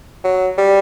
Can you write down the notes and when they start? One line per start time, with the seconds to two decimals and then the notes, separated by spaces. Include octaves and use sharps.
0.24 F#3
0.58 G3